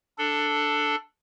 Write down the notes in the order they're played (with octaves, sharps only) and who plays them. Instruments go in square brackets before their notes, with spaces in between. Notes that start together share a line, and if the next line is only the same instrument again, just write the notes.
[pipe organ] D4 A4